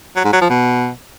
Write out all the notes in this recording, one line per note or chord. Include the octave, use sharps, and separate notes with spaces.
F#3
G#2
F#3
F3
B2